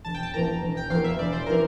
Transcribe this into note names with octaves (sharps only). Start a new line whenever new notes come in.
E1 A5
G5
A5
E2 E3 A#3 A#5
E1
G5
E2 E3 A#3 F5
E5
E1 D5
C5
E3 A#4